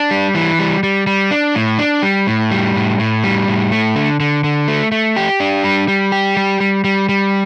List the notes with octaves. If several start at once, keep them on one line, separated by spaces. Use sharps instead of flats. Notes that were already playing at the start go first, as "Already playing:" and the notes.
Already playing: D4
G3
E3
G3
G3
G3
D4
A2
D4
G3
A2
G3
A2
A2
G3
A2
A3
D3
D3
D3
A3
A3
G4
D4
G3
G3
G4
G3
G3
G3
G3